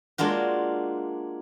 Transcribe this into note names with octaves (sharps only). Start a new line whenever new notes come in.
G#3 A#3 D4 F4 F#4